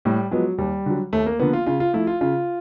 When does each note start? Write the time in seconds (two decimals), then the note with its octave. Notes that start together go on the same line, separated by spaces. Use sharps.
0.05 A2 G3
0.31 F3 F#3 G#3 B3
0.58 D#2 G3
0.86 D3 F#3
1.13 D#2 A3
1.26 A#3
1.40 D3 F3 A#3 B3
1.53 F4
1.66 C#3 F4
1.80 F4
1.93 F3 A3 E4
2.07 F4
2.21 C#3 F4